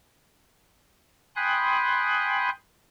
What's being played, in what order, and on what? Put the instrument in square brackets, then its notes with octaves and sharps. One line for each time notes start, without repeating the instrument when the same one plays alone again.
[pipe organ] G5 G#5 B5 C6 D#6 F#6